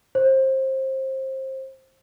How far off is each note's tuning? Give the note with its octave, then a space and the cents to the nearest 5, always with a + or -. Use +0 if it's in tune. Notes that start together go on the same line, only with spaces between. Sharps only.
C5 +25